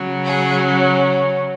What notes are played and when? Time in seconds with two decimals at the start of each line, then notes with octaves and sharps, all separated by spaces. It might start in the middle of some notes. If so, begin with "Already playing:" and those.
Already playing: C#3 F#3
0.25 G#4
0.66 C#4